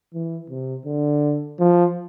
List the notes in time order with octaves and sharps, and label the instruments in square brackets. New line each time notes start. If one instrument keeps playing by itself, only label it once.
[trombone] E3
C3
D3
F3